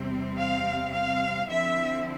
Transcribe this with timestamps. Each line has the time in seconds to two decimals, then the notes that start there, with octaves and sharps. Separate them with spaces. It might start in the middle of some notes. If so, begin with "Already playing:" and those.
Already playing: E2 C3 G3 C4
0.39 F5
0.94 F5
1.48 D3 F3 C4 E4 E5